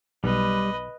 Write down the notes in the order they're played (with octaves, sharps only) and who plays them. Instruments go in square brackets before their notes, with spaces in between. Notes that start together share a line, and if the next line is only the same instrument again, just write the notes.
[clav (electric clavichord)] B1 [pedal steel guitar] G3 [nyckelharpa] B4 D#5